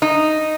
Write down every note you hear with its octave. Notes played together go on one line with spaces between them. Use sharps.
D#4